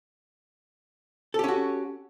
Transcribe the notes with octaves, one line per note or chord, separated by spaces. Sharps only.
C#4 F#4 G4 A4